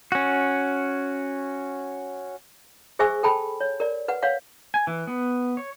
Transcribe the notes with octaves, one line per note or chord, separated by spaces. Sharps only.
C#4 F#4
G#4 C5 E5 G#5 C#6 E6
A4 G5 A5 B5
C#5
A#4 D5
B4 F#5
C#5 F5 F#5
G#5
E3
B3
C#5